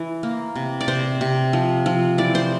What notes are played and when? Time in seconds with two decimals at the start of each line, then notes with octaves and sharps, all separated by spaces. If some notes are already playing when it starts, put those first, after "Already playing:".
Already playing: E3
0.23 A#3
0.55 C3
0.81 D5
0.88 C3 C5
1.21 C3
1.53 F3
1.86 F3
2.18 E3 D5
2.35 C5